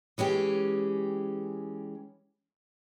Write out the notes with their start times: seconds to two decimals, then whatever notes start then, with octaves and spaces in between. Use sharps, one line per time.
0.18 E3 G#3 C#4 G4